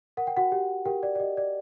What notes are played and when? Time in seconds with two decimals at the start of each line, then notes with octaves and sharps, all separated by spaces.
0.17 A#4 F#5
0.27 G5
0.37 F#4 F#5
0.52 G4
0.85 G4 A#4 G5
1.03 D5
1.15 D5
1.20 G4 D#5
1.37 D5